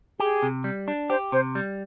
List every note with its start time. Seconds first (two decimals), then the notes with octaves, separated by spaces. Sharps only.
0.20 G4 G#4
0.43 C3
0.64 G3
0.88 D4
1.09 G4 C5
1.32 C3 C5
1.55 G3